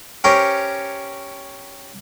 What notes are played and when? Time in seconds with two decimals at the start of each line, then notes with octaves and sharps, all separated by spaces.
0.24 C#4 G4 A#4 C5 C#5